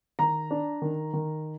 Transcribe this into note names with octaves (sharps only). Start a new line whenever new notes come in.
D#3 A#5
D4
D#3
D#3